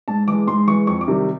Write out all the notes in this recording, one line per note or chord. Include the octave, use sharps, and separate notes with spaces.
G#2 A5
E3 G#3 D6
G#2 C6
E3 G#3 C#6
F2 C#6
D6
C3 D#3 G3